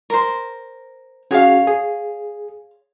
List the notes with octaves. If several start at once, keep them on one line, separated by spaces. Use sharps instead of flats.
A#4 C5
C#4 F#4 G#4 C#5 F5
G#4